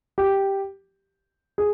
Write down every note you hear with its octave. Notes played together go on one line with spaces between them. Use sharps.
G4
G#4